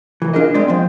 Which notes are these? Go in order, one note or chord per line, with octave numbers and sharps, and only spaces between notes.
C2 E3
D4 F4 G#4 A#4 D#5
G#3 C4 D5 D#5
F3 C4